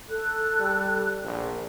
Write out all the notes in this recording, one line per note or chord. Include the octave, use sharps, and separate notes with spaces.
A4 F#6
G3
A#1